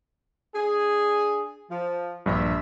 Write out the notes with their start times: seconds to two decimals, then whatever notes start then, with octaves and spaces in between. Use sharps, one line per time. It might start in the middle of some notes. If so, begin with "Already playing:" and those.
0.54 D4 G#4
1.70 F3
2.26 A#1 G2 E5